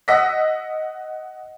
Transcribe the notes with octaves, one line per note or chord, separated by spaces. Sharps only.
D#5 F#5 D#6 E6 A#6 B6